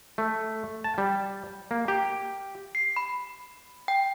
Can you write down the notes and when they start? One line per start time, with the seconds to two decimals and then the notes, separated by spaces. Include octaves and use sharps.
0.18 A3
0.84 A5
0.98 G3
1.71 A#3
1.88 G4
2.75 C7
2.96 B5
3.88 G5